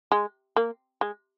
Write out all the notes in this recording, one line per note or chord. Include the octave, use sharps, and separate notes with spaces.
G#3
A#3
G#3